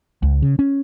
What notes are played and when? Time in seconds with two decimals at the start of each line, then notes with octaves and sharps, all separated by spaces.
0.23 C#2
0.42 C#3
0.59 C#4